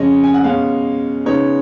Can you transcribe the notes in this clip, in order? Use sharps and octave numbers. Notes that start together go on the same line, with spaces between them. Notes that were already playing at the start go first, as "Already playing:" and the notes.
Already playing: F2 C#3 G#3 C#4 D#5
G#5
F#5
B2 G#3 C#4 F5
C#3 G#3 B3 D#4 C#5